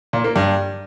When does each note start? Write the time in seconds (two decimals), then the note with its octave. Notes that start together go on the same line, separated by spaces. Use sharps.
0.13 A#2
0.24 A#3
0.36 G2